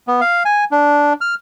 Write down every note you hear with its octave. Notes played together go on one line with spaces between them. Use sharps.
B3
F5
G#5
D4
F6